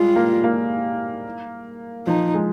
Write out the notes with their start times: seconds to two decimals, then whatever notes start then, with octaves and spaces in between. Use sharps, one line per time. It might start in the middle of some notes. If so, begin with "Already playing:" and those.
Already playing: G3 G#3 F4
0.16 A#3
0.44 A#3
2.06 F3 D#4
2.34 G#3